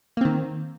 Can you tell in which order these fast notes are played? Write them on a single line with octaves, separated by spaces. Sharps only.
A#3 C4 D#3